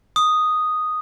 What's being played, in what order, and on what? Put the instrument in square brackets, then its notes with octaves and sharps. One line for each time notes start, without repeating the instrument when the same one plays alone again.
[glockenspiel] D#6